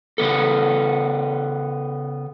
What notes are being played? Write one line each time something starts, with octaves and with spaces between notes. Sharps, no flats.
C#3 B3 A4